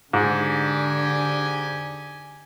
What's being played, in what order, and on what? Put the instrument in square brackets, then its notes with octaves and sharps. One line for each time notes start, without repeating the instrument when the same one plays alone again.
[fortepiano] G#2 [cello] D3 [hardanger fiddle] G4 G#5